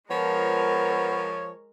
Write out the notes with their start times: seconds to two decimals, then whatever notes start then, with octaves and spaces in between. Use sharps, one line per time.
0.10 F3 G#3 B3 A#4 C#5